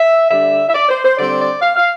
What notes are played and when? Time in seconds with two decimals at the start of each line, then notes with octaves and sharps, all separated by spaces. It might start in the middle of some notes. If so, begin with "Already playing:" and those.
Already playing: E5
0.30 D3 G3 D4 E5
0.68 E5
0.74 D5
0.89 C5
1.04 C5
1.17 D3 G3 C4 D5
1.40 D5
1.62 F5
1.76 F5